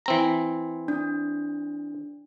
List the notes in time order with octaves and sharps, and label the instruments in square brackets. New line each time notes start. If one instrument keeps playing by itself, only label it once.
[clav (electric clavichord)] E3 C4 A#5
[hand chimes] D4